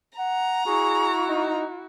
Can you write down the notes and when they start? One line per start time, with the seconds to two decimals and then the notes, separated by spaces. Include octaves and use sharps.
0.19 F#5 A#5
0.66 E4 F#4 G#4 C#6
1.29 D#4